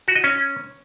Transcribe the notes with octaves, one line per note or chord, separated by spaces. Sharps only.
F#4
D#5
C#4